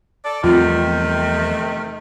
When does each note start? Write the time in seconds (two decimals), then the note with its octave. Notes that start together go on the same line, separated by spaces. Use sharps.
0.25 A4 D5
0.44 E2 C3 D#3 F3 G3 A3 C4 F4